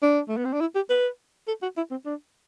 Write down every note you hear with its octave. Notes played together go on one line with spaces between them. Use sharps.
D4
A3
B3
C4
D4
E4
G4
B4
A4
F#4
E4
C4
D4